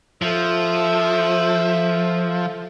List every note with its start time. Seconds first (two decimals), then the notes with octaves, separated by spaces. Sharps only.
0.22 F3 A4 E5